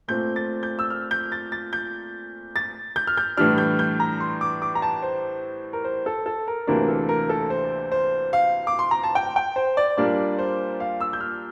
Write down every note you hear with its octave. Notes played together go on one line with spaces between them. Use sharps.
A#2 A3 C4 G6
A6
G6
E6
F6
G6
A6
A6
G6
A6
G6
F6
G6
A2 E3 G3 D4 F6
G6
G6
A#5
C6
D6
D6
A#5
A5
C5
A#4
C5
A4
A4
A#4
D2 C3 E3 A#3 D4 A#4
A4
A#4
A4
C5
C5
F5
D6
C6
A#5
A5
G5
G5
C5
D5
A#2 G3 A#3 D4 D5
C5
F5
E6
G6
F6